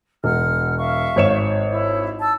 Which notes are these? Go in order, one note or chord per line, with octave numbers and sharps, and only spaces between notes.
E1 F#5 F6
E5 F5 C#6
G#1 C#5 E7
E4
A5 E6